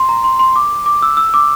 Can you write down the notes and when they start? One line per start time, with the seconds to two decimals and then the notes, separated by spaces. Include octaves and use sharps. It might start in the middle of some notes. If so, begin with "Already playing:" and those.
Already playing: C6
0.09 A#5
0.24 C6
0.39 C6
0.56 D6
0.86 D6
1.02 E6
1.17 E6
1.34 D6